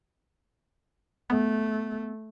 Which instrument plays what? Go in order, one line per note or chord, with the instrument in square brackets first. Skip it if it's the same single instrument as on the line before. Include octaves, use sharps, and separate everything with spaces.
[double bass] A3 [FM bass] B3